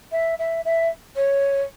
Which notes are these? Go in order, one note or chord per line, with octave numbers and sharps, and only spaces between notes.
E5
E5
E5
C#5